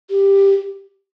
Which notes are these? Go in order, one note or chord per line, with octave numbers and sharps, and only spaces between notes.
G4